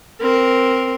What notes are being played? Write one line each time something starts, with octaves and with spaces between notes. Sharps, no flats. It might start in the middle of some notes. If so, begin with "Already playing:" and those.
C4 A#4